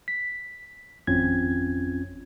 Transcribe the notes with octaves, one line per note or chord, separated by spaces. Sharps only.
B6
G#1 F2 C4 C#4 F4 G#6